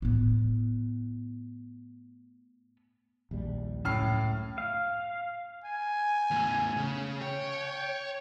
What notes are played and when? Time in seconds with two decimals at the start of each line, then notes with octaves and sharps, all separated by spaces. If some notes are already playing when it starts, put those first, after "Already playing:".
0.02 A2 B3
3.31 A#1 D#2 G3
3.85 C#2 F#2 A2 C#4 F6 C7
4.58 F5
5.64 G#5
6.31 E2 A3
6.76 C#3
7.22 C#5 G5